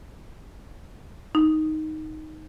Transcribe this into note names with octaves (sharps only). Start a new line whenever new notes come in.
D#4